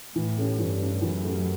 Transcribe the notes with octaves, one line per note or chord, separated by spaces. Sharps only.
A2 E3
A3 C#4 G4
G2 E3
A3 C#4 G4
F#2 E3
A3 C#4 G4